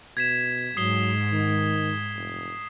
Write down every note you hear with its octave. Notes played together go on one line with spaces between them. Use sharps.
B2 G#6 B6 E7
G#2 F#3 D#6 C7 G7
D#3
F1